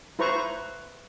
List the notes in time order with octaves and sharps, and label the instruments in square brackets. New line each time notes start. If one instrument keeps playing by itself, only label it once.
[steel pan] E4 B4 C5 A#5 C#6